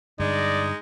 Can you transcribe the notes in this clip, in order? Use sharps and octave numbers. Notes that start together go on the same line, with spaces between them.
G2 D3 G#3 D#4 D5